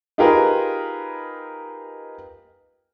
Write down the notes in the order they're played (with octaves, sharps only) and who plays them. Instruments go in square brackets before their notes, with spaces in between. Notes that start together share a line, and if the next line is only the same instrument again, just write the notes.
[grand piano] D#4 F4 G4 G#4 A#4 B4